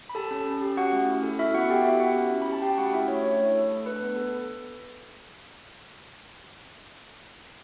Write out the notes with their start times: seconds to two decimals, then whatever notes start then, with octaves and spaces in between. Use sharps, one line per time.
0.09 B5
0.15 G4 A4 A5
0.31 C#4
0.46 C#4
0.61 G4
0.77 C#4 F#4 F#5
0.92 A3
1.08 E4
1.23 A4
1.39 E4 F#4 E5
1.54 B3 F#4 F#5
1.70 G4 A4 G5
1.85 B3 E4 E5
2.00 F#4 G4 F#5
2.16 C#4
2.32 C#4
2.42 B5
2.47 G4
2.53 A5
2.62 C#4 G4 G5
2.78 A3 F#4 F#5
2.93 E4 F#4 E5
3.08 A3 C#5
3.24 D4 C#5
3.39 A3
3.55 A4
3.71 A3
3.86 D4 B4
4.01 B3
4.16 A4